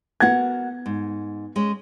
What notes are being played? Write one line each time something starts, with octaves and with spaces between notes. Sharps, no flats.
B3 F#4 A#4 F#5 G#6
G#2
G#3 C#4